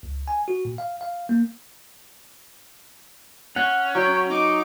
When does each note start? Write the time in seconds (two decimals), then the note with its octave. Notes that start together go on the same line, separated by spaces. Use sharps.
0.03 C#2
0.28 G#5
0.48 F#4
0.65 A#2
0.78 F5
1.01 F5
1.29 A#3
3.56 C#4 F#5
3.95 F#3 G5
4.30 D#4 D6